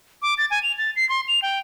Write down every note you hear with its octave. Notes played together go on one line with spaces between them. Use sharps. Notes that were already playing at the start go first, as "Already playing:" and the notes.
D6
A6
G#5
F7
A6
C7
C6
F7
G5